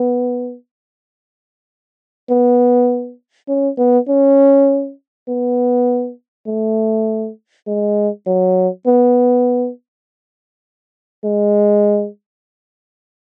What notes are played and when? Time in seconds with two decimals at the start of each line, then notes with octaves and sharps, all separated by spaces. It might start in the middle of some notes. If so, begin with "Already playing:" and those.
Already playing: B3
2.30 B3
3.48 C#4
3.78 B3
4.09 C#4
5.28 B3
6.47 A3
7.67 G#3
8.27 F#3
8.87 B3
11.24 G#3